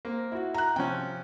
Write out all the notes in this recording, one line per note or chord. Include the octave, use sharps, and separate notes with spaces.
A#3 C4
E4 F#4
A#5 F#6
C3 F3 C#4 G5